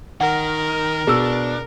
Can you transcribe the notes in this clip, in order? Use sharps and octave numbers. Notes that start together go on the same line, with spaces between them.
D#3 A#4 F#5
B2 D4 G#4 E6